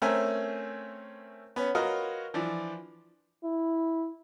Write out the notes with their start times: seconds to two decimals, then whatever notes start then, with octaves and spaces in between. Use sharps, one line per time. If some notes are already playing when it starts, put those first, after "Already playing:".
0.02 A3 C4 C#4 A#4 E5 G#5
1.56 B3 C#4
1.75 F4 F#4 A#4 B4 C#5 D#5
2.34 E3 F3 D4
3.44 E4